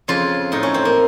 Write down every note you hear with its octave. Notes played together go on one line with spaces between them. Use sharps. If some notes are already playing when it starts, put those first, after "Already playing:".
F2 C#3 F4
A2 D#4
C#4
C4
A#3